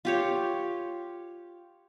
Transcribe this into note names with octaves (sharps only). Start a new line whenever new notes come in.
F4 G4 C#5